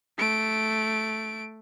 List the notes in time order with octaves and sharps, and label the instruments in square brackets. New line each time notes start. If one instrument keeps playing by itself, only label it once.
[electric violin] A3 D7